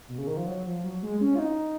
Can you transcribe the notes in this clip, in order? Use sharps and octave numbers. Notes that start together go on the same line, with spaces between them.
B2
C#3
D#3
F3
F#3
F3
F#3
G#3
C#4
F4
D#4